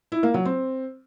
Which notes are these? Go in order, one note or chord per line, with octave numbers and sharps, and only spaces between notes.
E4
A#3
F#3
C4